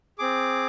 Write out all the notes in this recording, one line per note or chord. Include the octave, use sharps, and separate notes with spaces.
C4 G#4 D6